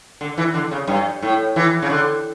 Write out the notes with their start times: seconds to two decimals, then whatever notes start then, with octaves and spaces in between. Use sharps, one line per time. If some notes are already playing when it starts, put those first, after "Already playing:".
0.21 D3
0.38 E3
0.54 D3
0.71 C#3
0.88 G2
1.22 A2
1.56 E3
1.82 C#3
1.90 D3